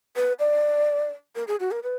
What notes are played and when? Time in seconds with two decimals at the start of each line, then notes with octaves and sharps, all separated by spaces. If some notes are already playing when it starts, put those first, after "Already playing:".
0.16 B4
0.39 D5
1.35 A#4
1.47 G#4
1.60 F#4
1.71 A#4
1.83 B4